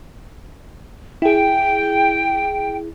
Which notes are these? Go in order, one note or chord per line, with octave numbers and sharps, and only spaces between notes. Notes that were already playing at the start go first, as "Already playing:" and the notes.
E4 G#4 G5